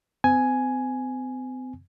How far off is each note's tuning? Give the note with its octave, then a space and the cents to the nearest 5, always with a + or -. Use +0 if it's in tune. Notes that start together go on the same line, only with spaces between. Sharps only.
C4 -40 G#5 +5